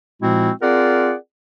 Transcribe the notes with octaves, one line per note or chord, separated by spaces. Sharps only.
A#2 F3 G#3 C4 E4 F#4
C4 F4 G#4 A#4 D5 F#5